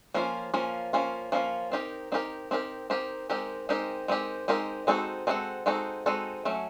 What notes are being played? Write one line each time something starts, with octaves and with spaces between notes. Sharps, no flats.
F3 A#3 C#4 F4
F3 A#3 C#4 F4
F3 A#3 C#4 F4
F3 A#3 C#4 F4
C4 D#4 G4 A#4
C4 D#4 G4 A#4
C4 D#4 G4 A#4
C4 D#4 G4 A#4
G#3 C4 D#4 G4 A#4
G#3 C4 D#4 G4 A#4
G#3 C4 D#4 G4 A#4
G#3 C4 D#4 G4 A#4
G#3 C4 D#4 F#4 A4
G#3 C4 D#4 F#4 A4
G#3 C4 D#4 F#4 A4
G#3 C4 D#4 F#4 A4
F#3 A3 C#4